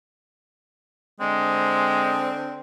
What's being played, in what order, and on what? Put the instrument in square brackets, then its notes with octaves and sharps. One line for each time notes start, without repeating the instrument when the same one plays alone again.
[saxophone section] D3 C4 [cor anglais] G#3